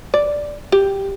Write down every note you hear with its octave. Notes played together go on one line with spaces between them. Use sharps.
D5
G4